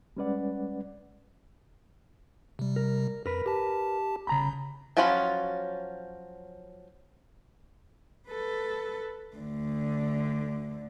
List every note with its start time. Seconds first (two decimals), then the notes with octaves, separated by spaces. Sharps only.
0.17 G3 G#3 C#4 B4 D5 F#5
2.59 C3 G3
2.76 A#4
3.26 F2 A#4 B4
3.46 G4 A5
4.27 G1 C#3 A#5 B5
4.97 F3 F#3 C#4 F4 B5
8.28 A4 B4
9.36 D2 D3